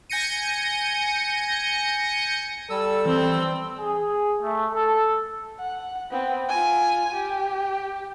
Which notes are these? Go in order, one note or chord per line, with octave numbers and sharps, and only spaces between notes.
G#5 G6 A#6 C#7 D#7
G3 A4 E6
E3 C4
G#4
A3
A4
F#5
B3 C4
F4 G#5
G4